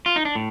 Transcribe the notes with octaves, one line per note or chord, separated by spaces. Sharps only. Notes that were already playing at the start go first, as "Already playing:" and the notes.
F4
D#4
D4
A2